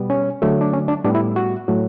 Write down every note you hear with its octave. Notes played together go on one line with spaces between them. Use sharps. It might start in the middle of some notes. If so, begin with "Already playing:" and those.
Already playing: B2 G3 B3
C#4
D3 F#3 A3
D4
C#4
D4
A2 G3 B3 D4
E4
F#4
A2 F#3 A3